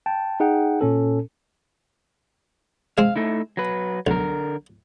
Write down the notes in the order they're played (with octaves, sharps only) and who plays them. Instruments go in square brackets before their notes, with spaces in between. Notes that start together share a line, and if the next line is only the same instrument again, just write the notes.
[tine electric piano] G5 A5
D#4 G#4 F#5 G5
A#2 C#4 A4
[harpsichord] G#3 C4 [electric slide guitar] F5
[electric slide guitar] A3 D#4 E4
F#3 B4
[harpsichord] B1 [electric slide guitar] D3 A#4